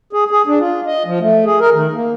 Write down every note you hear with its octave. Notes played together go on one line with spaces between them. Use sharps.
G#4
G#4
D4
F4
D#5
F3
A3
G#4
A#4
D#3
A#3